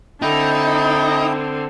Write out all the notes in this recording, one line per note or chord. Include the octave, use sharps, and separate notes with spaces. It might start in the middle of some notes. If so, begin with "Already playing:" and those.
D3 C4 D#4 E4 G5